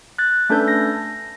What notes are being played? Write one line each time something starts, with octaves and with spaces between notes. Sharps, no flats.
F#6 A6
A3 C#4 D4 A4 B4 G6
A#6